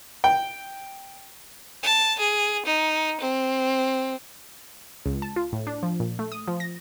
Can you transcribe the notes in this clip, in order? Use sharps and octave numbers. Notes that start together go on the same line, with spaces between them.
G5
A5
G#4
D#4
C4
C#2
A5
F4
A2
D4
F3
A#2
A3
D#6
F3
A#6